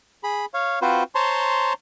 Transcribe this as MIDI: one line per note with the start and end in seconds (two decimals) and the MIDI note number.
0.23 0.46 68
0.23 0.46 83
0.54 0.79 73
0.54 0.79 77
0.82 1.03 60
0.82 1.03 65
0.82 1.03 66
0.82 1.03 71
0.82 1.03 72
1.15 1.73 72
1.15 1.73 73
1.15 1.73 81
1.15 1.73 82
1.15 1.73 84